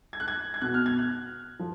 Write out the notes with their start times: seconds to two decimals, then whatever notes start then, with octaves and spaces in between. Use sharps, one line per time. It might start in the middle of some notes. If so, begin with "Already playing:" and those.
0.13 G#6
0.20 F#6
0.28 G#6
0.54 G#6
0.61 B2 F#6
0.74 F6
0.86 G#6
0.99 F#6
1.59 F3